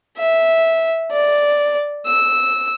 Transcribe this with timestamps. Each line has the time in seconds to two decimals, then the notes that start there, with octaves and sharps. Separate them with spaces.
0.17 E5
1.11 D5
2.06 E6